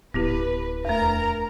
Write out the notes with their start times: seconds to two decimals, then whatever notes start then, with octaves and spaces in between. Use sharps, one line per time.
0.14 D1 B3 E4 G4 B4
0.85 E2 A3 A#4 A#5